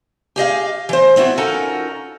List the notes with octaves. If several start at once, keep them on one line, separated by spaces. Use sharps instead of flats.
G4 G#4 D#5 F5
E3 C5
B3 C4 E4 F#4
C#4 D#4 F4 F#4 A4 A#4